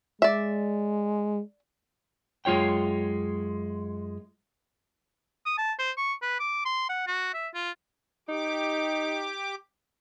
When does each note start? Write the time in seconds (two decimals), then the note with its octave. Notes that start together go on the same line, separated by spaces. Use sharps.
0.22 G#3 D5 E5
2.45 F#2 G#3 F4 C#5 G5
5.46 D#6
5.58 A5
5.79 C5
5.98 C#6
6.22 B4
6.40 D6
6.65 C6
6.89 F#5
7.07 F#4
7.34 E5
7.54 F4
8.29 D#4 G4 D6